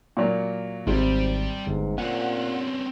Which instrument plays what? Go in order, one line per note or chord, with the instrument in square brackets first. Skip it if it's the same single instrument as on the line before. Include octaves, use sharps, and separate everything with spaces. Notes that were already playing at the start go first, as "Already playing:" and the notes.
[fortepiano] A#2 F#3 A#3
[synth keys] G#1 [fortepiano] C3 [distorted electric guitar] G3 [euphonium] C4
[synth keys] G1 [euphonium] G#2
[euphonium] A#2 [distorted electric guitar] C4 C#4 [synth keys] F#5 F#6